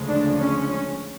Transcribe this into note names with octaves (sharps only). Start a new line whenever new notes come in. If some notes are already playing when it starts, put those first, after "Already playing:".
Already playing: D2 C#3 F3 G#3
D4
C#4